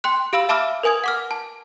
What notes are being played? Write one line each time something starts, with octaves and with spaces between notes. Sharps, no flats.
G5 C6 F#6
G4 F5 B5 E6 F#7
E5 A5 B5 D6 E6 F6
A#4 B4 G#5 D#6 G#6
F#5 D6 F6
A5